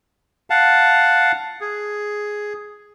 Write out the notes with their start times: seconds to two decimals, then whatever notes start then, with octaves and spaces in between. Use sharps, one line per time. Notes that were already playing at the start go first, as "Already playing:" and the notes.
0.50 F5 F#5 A5
1.61 G#4